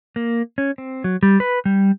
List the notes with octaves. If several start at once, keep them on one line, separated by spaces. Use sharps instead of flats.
A#3
C#4
C4
F#3
G3
B4
G3